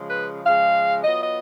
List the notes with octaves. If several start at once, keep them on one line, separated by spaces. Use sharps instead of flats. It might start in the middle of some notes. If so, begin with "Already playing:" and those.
Already playing: C#3 F3 G#3
B4
C#3 F3 G#3 F5
F#3 B3 F4 D#5
D#5